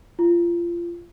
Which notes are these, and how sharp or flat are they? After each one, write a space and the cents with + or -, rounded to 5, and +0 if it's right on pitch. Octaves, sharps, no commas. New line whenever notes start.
F4 -25